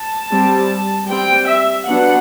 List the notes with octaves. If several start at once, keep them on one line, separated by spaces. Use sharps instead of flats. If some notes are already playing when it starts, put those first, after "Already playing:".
Already playing: A5
G3 C4
G3 C4 G5
E5
F#3 B3 D4 F#5